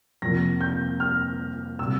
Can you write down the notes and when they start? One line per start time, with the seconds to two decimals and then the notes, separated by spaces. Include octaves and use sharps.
0.22 F2 C3 F3 A#3 A#6
0.61 G6
1.00 F6
1.79 C3 G3 E6